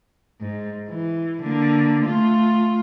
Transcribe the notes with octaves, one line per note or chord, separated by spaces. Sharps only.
G#2
E3
D3 A#3
A3 F4